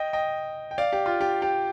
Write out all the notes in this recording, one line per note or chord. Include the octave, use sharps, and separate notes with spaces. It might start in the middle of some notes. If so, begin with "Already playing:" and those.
Already playing: D#5 G5
D#5 G5
G5
D5 F5
G4
F4
G4
G4